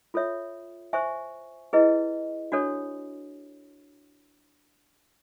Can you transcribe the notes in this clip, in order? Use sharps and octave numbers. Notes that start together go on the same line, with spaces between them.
F4 A4 C#5 E5
C5 E5 G#5 C#6
E4 G#4 B4 D#5
D4 F#4 A4 C#5